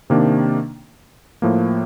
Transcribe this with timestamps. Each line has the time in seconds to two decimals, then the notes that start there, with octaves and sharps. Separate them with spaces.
0.10 C3 D#3 A#3 D4
1.42 A2 F3 A#3